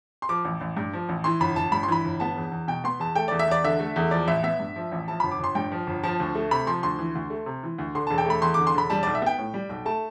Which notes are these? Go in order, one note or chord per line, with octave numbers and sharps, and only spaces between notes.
C6
F3 D6
A1
A1
G2
F3
A1
E3 C6
G1 B5
G1 A5
G2 B5
C6
E3 B5
G1
B3 A5
E2
E2
B2 G5
B3 C6
E2 A5
A3 G5
E2 D5
E5
E2 D5
D3 E5
A3
E2
F3 D5
A1 E5
B3 E5
G2
F3
A1
F3 A5
G1 B5
D6
G1 C6
G2 G5
F3
G1
F3 A5
D2
A3
C3 B5
F3 C6
D2 C6
E3
D2
A3
C3
E3
D2
D3 C6
E1 A5
G5
A3 B5
E2 C6
D3 D6
C6
E1 B5
G3 A5
B1 D5
E5
B3 G5
A2
G3
B1
A3 A5